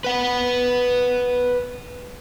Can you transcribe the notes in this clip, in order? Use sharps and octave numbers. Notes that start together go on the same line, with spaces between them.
B4 F#5